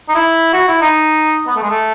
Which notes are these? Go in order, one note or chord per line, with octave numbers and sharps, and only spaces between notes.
D#4
E4
F#4
E4
D#4
B3
A3
G#3
A3